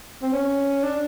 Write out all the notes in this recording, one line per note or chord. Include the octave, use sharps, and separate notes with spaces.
C4
C#4
D4